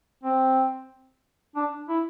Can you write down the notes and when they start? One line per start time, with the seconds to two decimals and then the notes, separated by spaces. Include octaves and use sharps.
0.23 C4
1.56 D4
1.89 E4